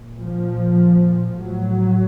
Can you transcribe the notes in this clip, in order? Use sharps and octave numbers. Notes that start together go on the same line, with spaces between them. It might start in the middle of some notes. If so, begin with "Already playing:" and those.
Already playing: A#2
F3
A2 F#3